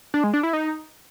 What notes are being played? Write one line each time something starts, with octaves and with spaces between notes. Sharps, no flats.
D4
G#3
D4
E4
D#4